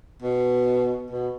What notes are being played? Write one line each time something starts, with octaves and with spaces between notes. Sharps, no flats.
B2
B2